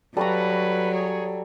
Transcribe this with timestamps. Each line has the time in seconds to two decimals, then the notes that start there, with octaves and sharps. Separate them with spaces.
0.17 F#3 G3 A4 B4 F5 A#5 C#6
0.92 G#4 C#5